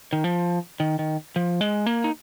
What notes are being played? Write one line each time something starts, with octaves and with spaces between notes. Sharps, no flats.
D#3
F3
D#3
D#3
F3
G#3
A#3
D#4